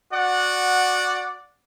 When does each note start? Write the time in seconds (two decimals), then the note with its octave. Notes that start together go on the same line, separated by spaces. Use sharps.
0.13 F#4 D5 F#5